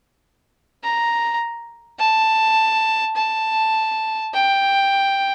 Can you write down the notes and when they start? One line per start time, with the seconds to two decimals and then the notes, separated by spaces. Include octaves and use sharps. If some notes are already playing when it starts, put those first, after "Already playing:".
0.84 A#5
2.00 A5
3.16 A5
4.34 G5